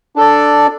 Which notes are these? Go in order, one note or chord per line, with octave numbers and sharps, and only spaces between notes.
D4 A4 D5